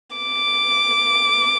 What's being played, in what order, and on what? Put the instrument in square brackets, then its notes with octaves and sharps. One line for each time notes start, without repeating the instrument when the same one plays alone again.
[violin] D6